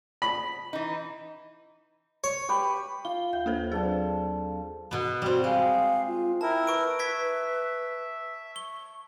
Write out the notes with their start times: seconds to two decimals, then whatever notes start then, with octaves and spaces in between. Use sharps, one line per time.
0.22 B5
0.73 E3 D#4
2.24 C#5
2.49 G4 B4 B5
3.05 F4 G7
3.33 D#2 E5 G6
3.46 A#3 A4 B4 C5
3.72 F#3 C4 D4 G#4 A4
4.91 B2 B3
5.22 G3 C4 F#4
5.44 G#3 F5
6.07 F4
6.41 E4 A#4 G5 A5
6.67 B4 C#6 D7
6.99 E5 C#6 G#6 B6
8.56 C#6 G7